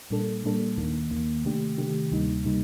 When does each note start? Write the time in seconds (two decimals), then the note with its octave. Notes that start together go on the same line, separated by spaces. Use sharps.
0.10 A#2 G3 A#3 D4 A4
0.44 A#2 G3 A#3 D4 A4
0.77 D#2 D#3 A#3
1.11 D#2 D#3 A#3
1.45 C3 D#3 A3 D4 G4
1.78 C3 D#3 A3 D4 G4
2.12 D2 C3 G3 A#3 D#4
2.45 C3 G3 A#3 D#4